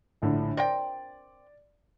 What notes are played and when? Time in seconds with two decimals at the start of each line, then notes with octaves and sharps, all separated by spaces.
0.22 A#1 A2 D3
0.57 C4 A#4 D5 G5